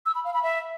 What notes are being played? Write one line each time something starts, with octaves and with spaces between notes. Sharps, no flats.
E6
B5
F5
B5
E5